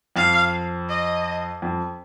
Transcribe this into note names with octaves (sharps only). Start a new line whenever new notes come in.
F2 F5
D#5
F2